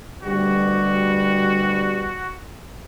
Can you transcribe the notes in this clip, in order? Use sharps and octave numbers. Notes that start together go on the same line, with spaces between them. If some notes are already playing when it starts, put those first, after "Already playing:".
D2 B2 G3 F#4